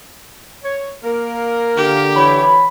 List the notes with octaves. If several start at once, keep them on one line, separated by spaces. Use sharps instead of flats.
C#5
A#3 A#4
D3 G4
E3 C#5 B5